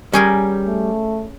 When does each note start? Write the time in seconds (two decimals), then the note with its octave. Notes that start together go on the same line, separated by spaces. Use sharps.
0.13 G3 C#4 G#4 A#4
0.67 A3